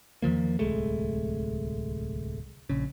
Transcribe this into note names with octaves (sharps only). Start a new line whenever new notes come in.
E2 D#3 F3 A#3
D1 C2 G#3 A3
A#1 C#3